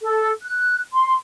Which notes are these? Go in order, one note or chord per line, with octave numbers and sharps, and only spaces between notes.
A4
F#6
C6